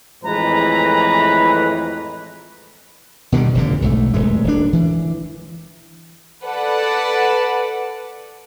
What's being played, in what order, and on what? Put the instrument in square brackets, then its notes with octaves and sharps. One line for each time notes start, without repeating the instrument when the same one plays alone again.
[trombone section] F2 A2 E3 [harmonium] G#3 [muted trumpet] B4 [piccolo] A#5
[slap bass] B2 D3 D#3 G3
F1 A#2 D3
B1 G#2 A3
D#1 G#3 A3
D#1 D4
E3
[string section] A4 B4 D5 F#5 A5